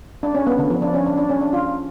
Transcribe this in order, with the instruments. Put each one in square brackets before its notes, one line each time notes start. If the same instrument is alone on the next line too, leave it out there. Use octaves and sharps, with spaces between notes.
[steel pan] D4
C#4
B3
D3
F3
D4
C#4
D4
D4
C#4
D4
F4